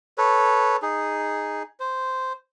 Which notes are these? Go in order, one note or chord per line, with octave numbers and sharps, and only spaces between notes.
A4 B4 C#5
D#4 G#4
C5